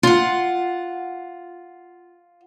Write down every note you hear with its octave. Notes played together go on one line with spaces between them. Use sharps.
F4 F#5